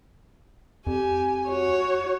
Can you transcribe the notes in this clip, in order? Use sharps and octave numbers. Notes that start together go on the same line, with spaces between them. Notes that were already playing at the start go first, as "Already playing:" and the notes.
F2 G4 G#5
F#4 C#5